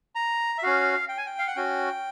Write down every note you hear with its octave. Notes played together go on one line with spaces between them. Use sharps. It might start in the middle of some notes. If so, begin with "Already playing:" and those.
A#5
E5
C#4 F#4 F5
G5
G#5
G5
F5
F#5
C#4 F#4 G5